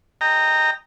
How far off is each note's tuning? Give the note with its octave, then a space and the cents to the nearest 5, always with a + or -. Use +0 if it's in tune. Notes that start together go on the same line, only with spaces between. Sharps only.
D#5 +0 G5 +0 A#5 -15